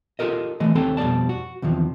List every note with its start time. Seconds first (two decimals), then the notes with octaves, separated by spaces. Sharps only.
0.19 F4 G4 A4 A#4 D#5
0.60 E3 G#3 A3 D#5
0.75 D#2 C3 C4 A4 G5 A#5
0.97 F2 B2 G3 D5 A5
1.29 F#4
1.62 E2 C3 D#3 F3